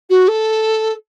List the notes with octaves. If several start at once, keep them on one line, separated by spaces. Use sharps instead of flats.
F#4
A4